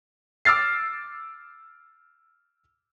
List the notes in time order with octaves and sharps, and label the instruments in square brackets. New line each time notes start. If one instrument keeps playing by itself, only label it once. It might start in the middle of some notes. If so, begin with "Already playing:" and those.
[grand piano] D6 E6 F6 A6 C7